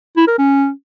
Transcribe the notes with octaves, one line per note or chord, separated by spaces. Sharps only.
E4
A#4
C#4